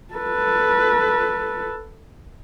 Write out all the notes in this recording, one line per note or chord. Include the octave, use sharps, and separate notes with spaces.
A4 B4